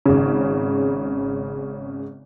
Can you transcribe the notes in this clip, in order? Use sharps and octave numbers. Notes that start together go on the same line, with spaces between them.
G#1 C#3